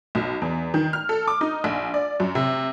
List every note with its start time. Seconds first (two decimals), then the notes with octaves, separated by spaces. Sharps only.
0.15 B1
0.42 E2
0.74 D#3
0.93 F6
1.09 A4
1.28 D6
1.41 D#4
1.64 A#1
1.94 D5
2.20 F#2
2.35 C3